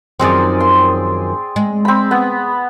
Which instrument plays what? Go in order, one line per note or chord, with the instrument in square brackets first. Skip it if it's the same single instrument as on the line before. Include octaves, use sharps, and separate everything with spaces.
[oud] F#2 D#3 F3 [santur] C4 G#4 D5
[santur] C6
[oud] G#3
[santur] C4 B5
B3